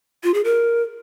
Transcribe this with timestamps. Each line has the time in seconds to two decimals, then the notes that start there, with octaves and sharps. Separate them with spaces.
0.24 F4
0.34 G#4
0.44 A#4